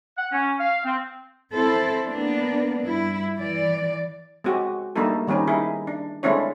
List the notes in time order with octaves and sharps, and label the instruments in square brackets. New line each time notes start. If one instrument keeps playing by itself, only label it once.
[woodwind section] F#5
C#4
F5
C4
[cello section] C4 E4 A4 C5
A#3 B3 D4
G2 E4
E3 D5
[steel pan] G#3 C4 F#4 G4
G3 A3 A#3 D4 D#4 A4
D#3 G3 C4 C#4 D#4
D#4 E4 G#4
D4
G#3 A3 C4 D4 E4 C#5